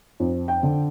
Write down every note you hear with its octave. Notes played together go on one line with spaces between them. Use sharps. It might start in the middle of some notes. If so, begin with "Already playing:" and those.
F2
G5
D3